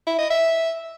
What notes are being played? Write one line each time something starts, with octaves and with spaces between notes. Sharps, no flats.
E4
D#5
E5